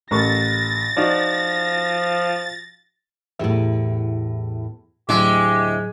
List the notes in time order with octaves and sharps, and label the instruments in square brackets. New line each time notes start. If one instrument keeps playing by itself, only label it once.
[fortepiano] A1 A#4 C#6 [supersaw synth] A6 [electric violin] A#6
[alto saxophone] F3 [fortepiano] D#4 F#4 D5
[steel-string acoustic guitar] E2 A2 [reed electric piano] E4 G4 E5
[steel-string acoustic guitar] D2 E4 D#5 [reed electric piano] A2 F#3 [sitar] G#3 [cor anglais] G4